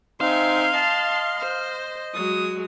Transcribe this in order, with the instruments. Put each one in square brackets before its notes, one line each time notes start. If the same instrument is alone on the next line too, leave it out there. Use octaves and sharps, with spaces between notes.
[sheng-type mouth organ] C4 D#4 [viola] E5 G#5 [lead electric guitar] F5 [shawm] C6
[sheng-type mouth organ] D#5 [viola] A5
[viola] C5
[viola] F#3 G#3 [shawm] D#6